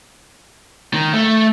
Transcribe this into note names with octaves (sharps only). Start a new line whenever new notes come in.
D#3
A3